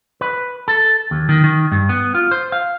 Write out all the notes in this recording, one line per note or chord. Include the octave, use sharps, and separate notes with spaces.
B4
A4
D#2
D#3
D#3
G2
B3
F4
C5
F5